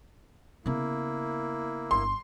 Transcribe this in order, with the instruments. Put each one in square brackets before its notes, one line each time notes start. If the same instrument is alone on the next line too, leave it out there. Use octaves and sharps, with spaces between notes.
[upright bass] C#3 B3 [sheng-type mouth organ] A#3 E4
[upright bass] G1 [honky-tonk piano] C6